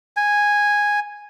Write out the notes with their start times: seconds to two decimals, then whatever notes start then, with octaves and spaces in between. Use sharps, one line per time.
0.17 G#5